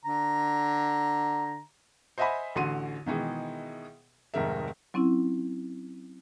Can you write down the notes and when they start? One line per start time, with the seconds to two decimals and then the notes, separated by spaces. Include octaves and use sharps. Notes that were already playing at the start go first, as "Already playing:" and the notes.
0.05 D3 A#5
2.18 C5 D#5 E5 F#5 G#5 B5
2.55 A1 D3 F#4 C6 D#7
3.06 B2 D#3 E3 G#3
4.34 F1 G#2 D#3 A#4 E5
4.94 F#3 C4 C#4 E4